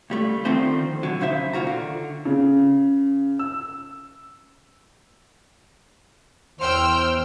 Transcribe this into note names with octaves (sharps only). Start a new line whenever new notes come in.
C#2 G3 A3
D3 D#3 F3 A3 C4 C5
D3 F#3
F#2 C#3 D#4 C5 E5
A#2 D#3 F4 F#4 A#5
D3
C#3
E6
E2 C5 G5 E6 F6